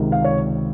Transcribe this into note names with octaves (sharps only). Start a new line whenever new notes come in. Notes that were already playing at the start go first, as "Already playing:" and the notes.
Already playing: C#2 C3 D#3
F5
C#5